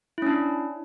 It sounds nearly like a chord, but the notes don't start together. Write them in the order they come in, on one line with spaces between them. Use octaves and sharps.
E4 C#4 D4